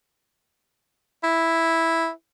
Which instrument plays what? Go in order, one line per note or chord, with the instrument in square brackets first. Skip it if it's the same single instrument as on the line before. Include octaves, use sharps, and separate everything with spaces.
[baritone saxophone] E4